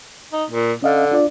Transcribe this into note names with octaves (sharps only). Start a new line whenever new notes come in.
D#4
A#2
D3 C#4 D#5 F5
D4 F4 D5